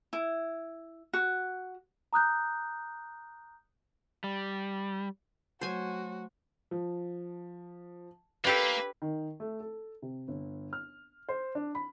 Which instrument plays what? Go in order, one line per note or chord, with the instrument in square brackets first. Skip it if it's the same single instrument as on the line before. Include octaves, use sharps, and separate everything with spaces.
[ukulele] E4
F#4
[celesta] A#5 D#6 F#6 G6
[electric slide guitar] G3
[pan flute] F#3 [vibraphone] A3 [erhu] F#4 [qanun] C5 G#5
[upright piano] F3
[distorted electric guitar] A#3 [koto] D4 G4 A4 [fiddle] B4
[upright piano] D#3
A3
A4
C3
G1
F6
C5
D4
B5